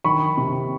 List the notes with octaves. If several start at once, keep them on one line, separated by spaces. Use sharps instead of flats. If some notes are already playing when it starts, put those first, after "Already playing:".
D#3 B5 C#6
C3